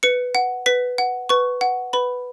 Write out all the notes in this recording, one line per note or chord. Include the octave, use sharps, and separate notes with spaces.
B4 C#7
F#5
B4 B6
F#5
B4 C#6
F#5
B4 B5